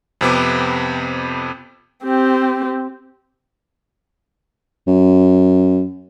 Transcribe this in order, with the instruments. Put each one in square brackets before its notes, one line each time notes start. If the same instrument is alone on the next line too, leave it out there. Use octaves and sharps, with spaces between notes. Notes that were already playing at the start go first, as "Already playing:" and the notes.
[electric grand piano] F2 C3 B3 D6
[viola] C4 G4
[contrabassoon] F#2